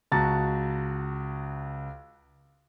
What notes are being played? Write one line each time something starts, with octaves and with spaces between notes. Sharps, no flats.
C#2 F#4 A5 A#5 A6